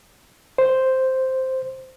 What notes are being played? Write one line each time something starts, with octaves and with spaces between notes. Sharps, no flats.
C5